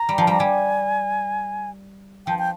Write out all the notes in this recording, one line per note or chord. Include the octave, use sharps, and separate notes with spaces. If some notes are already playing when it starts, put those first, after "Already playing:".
Already playing: A#5
G3
F3
G3 A#5
G3 G#5
F3 G5
G5